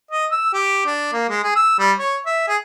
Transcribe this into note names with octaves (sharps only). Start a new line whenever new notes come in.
D#5
E6
G4
D4
A#3
G#3
G#4
E6
G3
C#5
E5
G#4